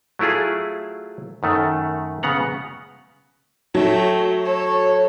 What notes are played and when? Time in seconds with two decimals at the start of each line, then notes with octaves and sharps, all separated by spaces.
0.19 F#3 A3 E4 F4 G#4
1.43 F#2 D#3 A3
2.23 C#3 B3 F#5 A#5
3.75 F#3 A3 G5
4.45 A4 C#5